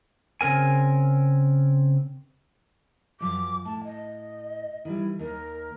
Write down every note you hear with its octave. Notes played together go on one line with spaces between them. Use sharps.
C#3 C4 A#4 G#5
F#2 F3 D5 D6
A2 A5
D#5
D#3 E3 G3 E4
D#2 D#4 A#4